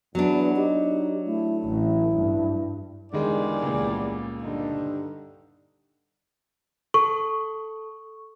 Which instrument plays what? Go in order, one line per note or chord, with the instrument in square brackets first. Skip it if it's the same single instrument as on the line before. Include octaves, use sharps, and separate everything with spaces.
[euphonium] E2 [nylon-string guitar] F#3 D4 [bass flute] B3
[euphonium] D#4 [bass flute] G4
[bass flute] A3 [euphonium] E4
[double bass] A1 [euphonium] E4
[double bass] G2
[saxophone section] E2 G3 D5 [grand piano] D3 D#3 G#3
[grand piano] C#2 A#2
[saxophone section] G2 D3 D#4
[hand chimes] A4 [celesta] C#6